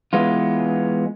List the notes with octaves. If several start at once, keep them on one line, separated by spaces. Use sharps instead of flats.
E3 G#3 B3 F4